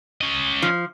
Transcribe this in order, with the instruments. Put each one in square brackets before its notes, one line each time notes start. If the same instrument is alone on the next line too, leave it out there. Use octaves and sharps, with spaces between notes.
[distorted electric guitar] C#4 D#5
[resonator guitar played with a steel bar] F3